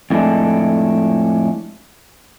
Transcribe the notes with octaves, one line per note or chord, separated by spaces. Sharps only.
F2 A2 G#3 A3 D4